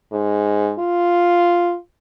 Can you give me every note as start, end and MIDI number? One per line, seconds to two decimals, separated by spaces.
0.13 0.72 44
0.79 1.76 65